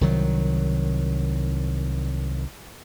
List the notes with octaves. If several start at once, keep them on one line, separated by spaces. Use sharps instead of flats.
C2 D#3 F#3